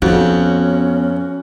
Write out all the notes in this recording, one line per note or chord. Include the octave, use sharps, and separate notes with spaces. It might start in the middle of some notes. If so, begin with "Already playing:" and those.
F2 B3 C#4 F#4